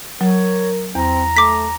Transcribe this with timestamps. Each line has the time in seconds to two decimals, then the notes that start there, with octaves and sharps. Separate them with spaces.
0.21 F#3 A#4 C#5
0.95 E2 C4 A#5
1.37 A3 D6 B6